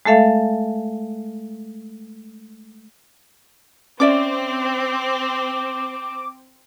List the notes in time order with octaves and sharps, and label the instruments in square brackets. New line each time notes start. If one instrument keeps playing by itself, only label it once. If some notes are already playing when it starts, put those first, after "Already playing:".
[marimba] G#3 A3 A4 E5 F5
[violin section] C4 [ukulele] C#4 D5 E5 [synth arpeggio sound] D6